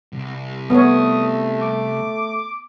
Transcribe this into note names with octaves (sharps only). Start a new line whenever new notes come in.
C2
A3 B3 C#5 D#6
D6